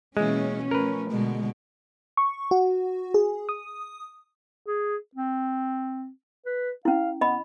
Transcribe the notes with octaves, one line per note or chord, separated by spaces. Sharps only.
B2 E3 G#3 A#3 C#4
F3 A3 A#4 B4
B2 D3 G#3
C#6
F#4
G#4
D#6
G#4
C4
B4
C#4 E4 F5
B3 D#5 B5